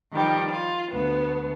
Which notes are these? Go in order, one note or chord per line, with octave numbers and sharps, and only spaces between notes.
D#3 F3 G3
F4
D2 B3